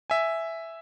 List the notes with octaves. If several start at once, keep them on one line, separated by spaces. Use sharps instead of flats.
E5 G#5